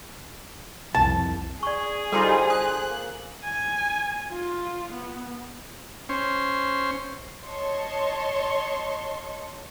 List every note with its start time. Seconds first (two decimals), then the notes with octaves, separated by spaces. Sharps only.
0.95 C2 F2 A5
1.63 G#4 D5 C#6
2.12 D3 G3 D#4 F4 A4 C5
2.50 F4 D#6 F#6
2.88 A#3
3.44 G#5
4.31 F4
4.92 B3
6.09 C#4 C5
7.45 C#5 D#5 A5 C6 C#6